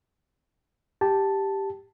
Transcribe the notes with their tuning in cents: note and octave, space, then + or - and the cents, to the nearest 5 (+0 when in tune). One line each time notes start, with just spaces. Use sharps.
G4 +0 A5 +0